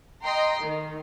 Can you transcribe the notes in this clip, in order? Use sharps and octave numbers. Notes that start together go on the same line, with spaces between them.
D#5 G5 A#5 C6
D#3